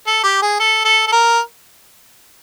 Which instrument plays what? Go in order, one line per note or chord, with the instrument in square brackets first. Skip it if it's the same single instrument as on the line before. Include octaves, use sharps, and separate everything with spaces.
[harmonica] A4
G4
G#4
A4
A4
A4
A#4